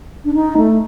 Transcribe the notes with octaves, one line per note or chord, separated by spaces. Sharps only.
D4
D#4
A3